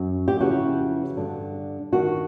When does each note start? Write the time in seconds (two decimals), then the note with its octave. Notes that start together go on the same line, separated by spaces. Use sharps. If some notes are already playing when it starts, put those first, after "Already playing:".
Already playing: F#2
0.28 G4
0.39 F2 C#3 E3 F#4
1.17 G2 D3
1.92 G2 D#3 F#4